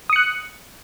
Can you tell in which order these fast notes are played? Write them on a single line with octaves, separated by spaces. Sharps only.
D#6 C#7 F#6